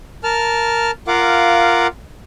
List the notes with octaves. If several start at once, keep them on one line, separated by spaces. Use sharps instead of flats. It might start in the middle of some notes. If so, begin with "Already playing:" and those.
A#4 A5 F6
F4 A#4 F5 F#5 D6